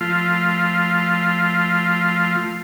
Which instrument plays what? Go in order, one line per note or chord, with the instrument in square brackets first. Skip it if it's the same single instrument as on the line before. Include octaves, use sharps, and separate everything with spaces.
[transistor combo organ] F3 A3 F4